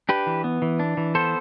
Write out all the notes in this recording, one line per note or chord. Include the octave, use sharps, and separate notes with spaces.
D4 G4 B4
E3
B3
E3
D4
E3
B3 A4 C5